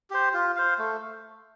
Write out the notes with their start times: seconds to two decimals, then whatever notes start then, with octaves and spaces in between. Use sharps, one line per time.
0.10 G4 C5
0.33 F4
0.56 C5 F5
0.78 A3